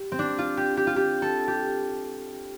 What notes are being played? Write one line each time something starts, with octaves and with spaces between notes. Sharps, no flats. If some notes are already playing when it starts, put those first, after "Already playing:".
Already playing: G4
C4
D4
F4
G4
G4
F4
G4
A4
G4